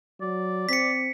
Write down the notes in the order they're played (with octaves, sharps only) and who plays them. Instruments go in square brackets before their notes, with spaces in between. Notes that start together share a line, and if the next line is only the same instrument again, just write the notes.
[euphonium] F#3 [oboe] D5
[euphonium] C4 [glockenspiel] B6 C#7